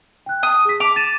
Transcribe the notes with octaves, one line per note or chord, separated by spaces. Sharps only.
G5 F#6
D#6
G#4 B6
D6 F7
A6 D#7 E7